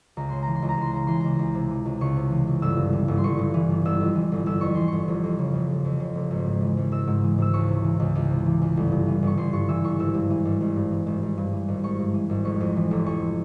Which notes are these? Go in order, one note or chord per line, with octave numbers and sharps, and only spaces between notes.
C#2 A#5
C#3 C6
E3 A#5
C6
C#2
A#5
C#2 C6
C#3 A#5
E3 C6
C#2 A#5
C#2
C3
E3
C#2
C#2 C#6
C3
E3
C#2
G1 E6
G2
E3
G1
C6
G1 C#6
G2
E3
G1
G1 E6
F2
E3
G1
G1 E6
F2 C#6
E3 C6
G1 C#6
F1
F2
C#3
F1
F1
F2
C#3
F1
G#1
G#2
E3
G#1
G#1 E6
G#2
E3
G#1 E6
C#2 C#6
C3
E3
C#2
C#2
C3
E3
C#2
G1
G2
E3
G1 C#6
G1 C6
G2 C#6
E3 E6
G1 C#6
G#1 E6
G2
E3
G#1
G#1
G2
E3
G#1
G#1
G2
E3
G#1
G#1 C#6
G2
E3
G#1
F1 C#6
F2
E3
F1
F1 C#6